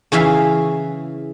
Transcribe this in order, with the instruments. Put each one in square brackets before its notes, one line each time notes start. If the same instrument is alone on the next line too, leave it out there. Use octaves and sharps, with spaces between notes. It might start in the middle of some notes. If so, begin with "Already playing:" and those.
[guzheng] C#3 E3 G#4 E5 F5